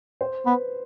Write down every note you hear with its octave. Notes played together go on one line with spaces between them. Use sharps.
C5
B3 B4